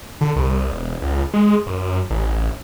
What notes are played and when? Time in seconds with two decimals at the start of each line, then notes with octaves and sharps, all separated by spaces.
0.21 D3
0.36 C2
0.72 E1
1.02 C#2
1.34 G#3
1.67 F#2
2.10 A1